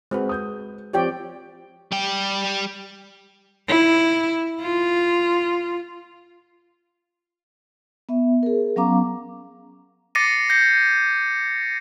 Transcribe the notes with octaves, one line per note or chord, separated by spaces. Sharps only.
G#3 C4 F#4 B4
D#6 G6
F3 C4 G4 C#5 D5 G5
G3 G5
E4
F4
B3 E5
G#4 A#4
F#3 B3 C#4 F5 A#5 D6
D6 A6 A#6 C7 C#7 D#7
G6 A#6 C7 C#7